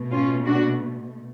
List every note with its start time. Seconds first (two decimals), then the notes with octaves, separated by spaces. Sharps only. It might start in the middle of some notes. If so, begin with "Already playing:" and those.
Already playing: B2 A3
0.11 C#4 F4
0.45 D4 F#4